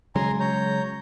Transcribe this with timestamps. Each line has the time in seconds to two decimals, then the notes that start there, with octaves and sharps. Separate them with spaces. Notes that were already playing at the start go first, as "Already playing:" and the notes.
0.15 C#3 F#3 G#3 G#5 A#5 C6
0.40 C#5 A#5 G6